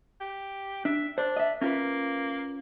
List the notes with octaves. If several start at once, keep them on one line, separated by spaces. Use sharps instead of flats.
G4
D4 E5
D4 C5
D#5 E5
A#3 C#4 F4 B4